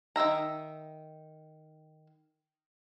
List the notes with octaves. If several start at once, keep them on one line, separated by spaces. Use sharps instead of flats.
D#3 E3 E5 A#5